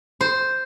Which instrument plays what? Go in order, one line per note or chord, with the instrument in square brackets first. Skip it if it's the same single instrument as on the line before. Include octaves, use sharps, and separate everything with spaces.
[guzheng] C5